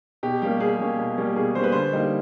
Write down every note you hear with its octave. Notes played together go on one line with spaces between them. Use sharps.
B2 G4
G3 A#3 C#4 G4
B2 G#4
G3 A#3 C#4
B2
G3 A#3 C#4
B2 G#4
G3 A#3 C#4 C5
B4
D3 C5
G3 A#3 D#4